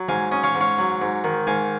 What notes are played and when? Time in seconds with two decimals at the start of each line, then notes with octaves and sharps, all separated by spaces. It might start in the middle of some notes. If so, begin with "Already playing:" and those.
Already playing: F#3
0.09 G#2 F5 G#5
0.31 C#4 D#5
0.43 C#5 F5
0.55 G#2
0.61 C#5 F5
0.79 F#3
1.02 G#2
1.24 D#3
1.47 G#2 F5 G#5